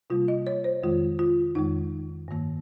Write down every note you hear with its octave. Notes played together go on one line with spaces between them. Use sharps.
C3 G3 A#3 F4
D#5
C#5
C5
F2 D#3 G#3 F4
F4
F2 D#3 G#3 D#4
G2 D#3 A#3